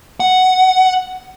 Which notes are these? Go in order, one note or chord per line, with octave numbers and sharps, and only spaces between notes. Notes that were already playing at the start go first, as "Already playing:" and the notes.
F#5